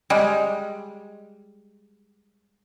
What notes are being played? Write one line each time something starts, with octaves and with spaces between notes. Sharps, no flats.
G3 G#3